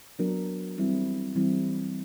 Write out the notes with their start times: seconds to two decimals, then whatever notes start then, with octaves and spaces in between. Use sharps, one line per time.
0.19 F#3 B3 D4 F#4 A#4
0.77 E3 G3 C4 E4
1.35 E3 G3 C4 E4